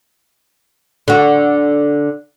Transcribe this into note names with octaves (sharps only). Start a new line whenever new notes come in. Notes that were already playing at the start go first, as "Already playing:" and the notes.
D3 F#4